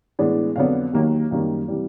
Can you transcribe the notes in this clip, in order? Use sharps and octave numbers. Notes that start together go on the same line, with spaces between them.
A2 E3 G#3 B3 D4
F2 D3 F#3 B3 D4 F5
D#2 D#3 F#3 A#3
F#2 D#3 G3 A#3 F5
C3 E3 G3